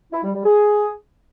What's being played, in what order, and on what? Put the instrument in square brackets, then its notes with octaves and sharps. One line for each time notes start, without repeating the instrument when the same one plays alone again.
[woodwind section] E4
G3
G3
G#4